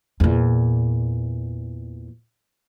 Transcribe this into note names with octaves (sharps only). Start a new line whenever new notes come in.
E2 A#2